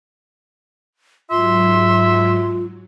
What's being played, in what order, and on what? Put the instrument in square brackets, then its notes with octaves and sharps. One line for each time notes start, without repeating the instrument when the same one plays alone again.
[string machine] G#2 F#3 [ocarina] F4 [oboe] E5 [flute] C6